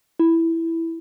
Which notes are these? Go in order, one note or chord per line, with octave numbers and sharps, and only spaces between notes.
E4